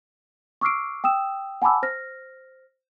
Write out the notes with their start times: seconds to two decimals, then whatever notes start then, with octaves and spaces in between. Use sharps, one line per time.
0.61 C#6 D6 E6 F6 C7 D7
1.04 G5 D#6 E6 E7
1.62 F#5 G#5 A5 B5 D6 E6
1.83 C5 F6 A#6